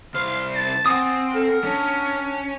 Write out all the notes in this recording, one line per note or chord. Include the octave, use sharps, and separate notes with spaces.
C2 C5 F5
A5
C4 F#5 G#5 D#6
A4 A#4
C#4 D4